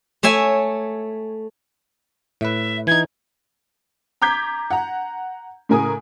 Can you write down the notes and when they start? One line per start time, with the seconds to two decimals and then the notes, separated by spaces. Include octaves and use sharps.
0.23 A3 C#5 E5 G#5
2.41 A2 B4 E5
2.87 E3 D#4 G#6
4.22 A#5 D6 G6 G#6 B6
4.71 F#5 A#5
5.69 A2 C#3 A#4 G#5 D#6